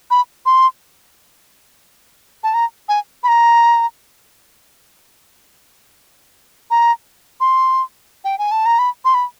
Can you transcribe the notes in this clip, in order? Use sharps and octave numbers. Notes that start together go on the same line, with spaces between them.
B5
C6
A5
A#5
G#5
B5
A#5
A#5
C6
G5
G#5
A5
A#5
B5
C6
B5